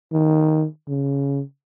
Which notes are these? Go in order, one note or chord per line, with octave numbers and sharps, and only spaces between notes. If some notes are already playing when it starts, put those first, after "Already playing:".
D#3
C#3